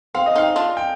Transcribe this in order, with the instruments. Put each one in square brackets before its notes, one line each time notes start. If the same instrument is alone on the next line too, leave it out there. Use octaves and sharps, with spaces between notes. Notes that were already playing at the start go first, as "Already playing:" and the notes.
[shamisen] C4 [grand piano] F5
[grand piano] D#5
[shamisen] C4 D#4 [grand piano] F5
[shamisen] D4 F4
[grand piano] G5